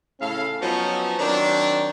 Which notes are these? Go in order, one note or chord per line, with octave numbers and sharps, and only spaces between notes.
A2 C#3 C#4 A4 F5
F3 F#3 B3 C#4 D#4 F#4
D#3 F#3 C4 D4